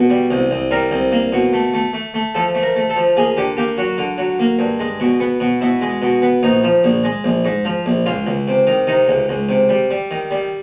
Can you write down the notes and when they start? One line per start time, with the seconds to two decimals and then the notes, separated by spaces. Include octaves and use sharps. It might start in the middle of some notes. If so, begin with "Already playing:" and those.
Already playing: B2
0.10 G3
0.31 C2
0.51 C2
0.71 G3 A#4
0.91 C2
1.12 A#3
1.33 B2
1.53 A3
1.74 A3
1.93 A3
2.14 A3
2.35 F3 A4
2.55 A3
2.63 A#4
2.76 A3
2.90 A4
2.96 F3
3.17 A#3 G#4
3.37 D3 G4
3.57 A#3 G4
3.78 F#3 F#4
3.98 D3
4.18 F#3
4.39 A#3
4.59 G2
4.79 G#3
5.00 B2
5.20 B3
5.40 B2
5.61 B2 E4
5.81 G#3
6.02 B2
6.22 B3
6.43 A#1 D#4
6.64 F3
6.84 A#1
7.04 G#3
7.24 A#1
7.45 G#2
7.65 F3
7.86 A#1
8.06 C#2 F4
8.27 C#2
8.48 C3
8.67 D#3
8.87 C3 D#4
9.08 C#2
9.29 C#2
9.49 C3
9.69 G3
9.91 G3
10.11 D#3
10.31 G3